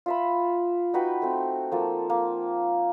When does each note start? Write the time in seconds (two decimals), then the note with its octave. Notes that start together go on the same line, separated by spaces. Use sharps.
0.06 F4 E5 B5
0.94 D#4 F#4 B4 G5
1.22 A3 C4
1.72 F3 A#3 A4
2.10 A#3